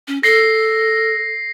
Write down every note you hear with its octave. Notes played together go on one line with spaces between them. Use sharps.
C#4
A4 A#6 C7